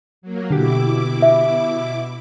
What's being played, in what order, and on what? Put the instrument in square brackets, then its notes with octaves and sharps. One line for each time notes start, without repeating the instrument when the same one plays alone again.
[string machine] F#3 A#3
[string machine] B2 E4 D6 [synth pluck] D3 G4
[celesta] E5